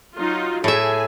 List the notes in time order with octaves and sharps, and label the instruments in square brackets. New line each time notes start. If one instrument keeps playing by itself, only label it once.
[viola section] F#3 D#4 F4
[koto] A2 E5 [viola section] G#4 G#5